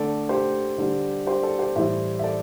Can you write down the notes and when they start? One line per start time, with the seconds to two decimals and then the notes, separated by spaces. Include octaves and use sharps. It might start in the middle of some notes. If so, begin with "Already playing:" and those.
Already playing: D3 A3 A4 D5
0.29 G4 C5
0.78 D3 G3
1.27 G4 C5
1.43 A4 D5
1.59 G4 C5
1.76 A2 E3 G3 C5 E5
2.19 E5
2.24 A4 D5